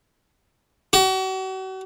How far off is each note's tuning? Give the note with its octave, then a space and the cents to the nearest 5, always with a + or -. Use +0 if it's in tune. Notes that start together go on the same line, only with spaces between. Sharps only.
F#4 +40